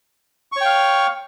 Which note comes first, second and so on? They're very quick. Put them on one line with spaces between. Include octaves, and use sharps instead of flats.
C#6 C#5 G5 F5